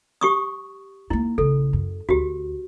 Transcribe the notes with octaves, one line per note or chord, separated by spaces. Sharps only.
G4 C#6 D#6
A#3 D#4 E4
A#1 C#3 A4
F#2
D2 F#4 G4